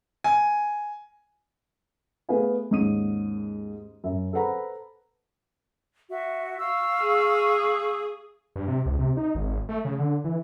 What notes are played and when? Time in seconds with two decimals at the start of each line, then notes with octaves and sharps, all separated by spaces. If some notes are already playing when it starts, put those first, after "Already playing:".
0.24 G#5
2.29 A3 B3 G#4 B4 F5 G#5
2.70 D#2 G#2 C#4 D#6 D#7
4.04 F#2 E5
4.33 A4 B4 C5 F#5 A#5 B5
6.10 F#4 E5
6.59 F5 C#6 E6
7.00 G#4
8.56 G2
8.68 C3
8.86 C#2
8.99 C3
9.17 D#4
9.35 G#1
9.69 A3
9.85 C#3
9.99 D3
10.24 E3